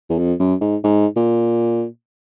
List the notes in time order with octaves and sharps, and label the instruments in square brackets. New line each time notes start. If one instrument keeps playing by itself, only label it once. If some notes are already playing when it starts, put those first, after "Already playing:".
[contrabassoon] E2
F2
F#2
G#2
G#2
A#2